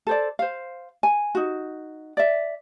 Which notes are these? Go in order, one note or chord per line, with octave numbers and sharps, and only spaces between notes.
A4 C5 D5
C5 F5
G#5
D#4 F#4
D5 E5